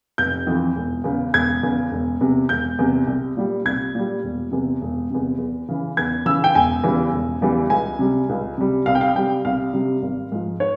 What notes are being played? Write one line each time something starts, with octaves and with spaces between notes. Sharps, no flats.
F1 G6
F2 E3
E1
E2 C#3
E1 G#6
E2 C#3
E1
E2 C3
E1 G6
E2 C3
C2
A#2 G3
C2 G#6
A#2 G3
E1
E2 C3
E1
E2 C3
E2
C#3 E3
E2 G#6
C#3 E3 E6
G5
E1 G#5
E2 C#3 E3 G3
E1
E2 C#3 E3 G3
C#2 G#5
C3 G3
C#2
C3 G3
C2 F5
G5
F5
C3 G3 G5
C2 F5
C3 G3
G#1
G#2 F3
C#5